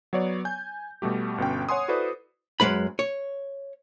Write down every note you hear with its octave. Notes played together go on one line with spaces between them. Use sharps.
F#3 B3 C#5 D5
G#5 G6
B2 G3 A3 G4
G1 B2 C#4 G5
C#5 F#5 G#5 C6 D#6
E4 F#4 A4 B4 C5 D5
F#2 F#3 G#3 B4 B5
C#5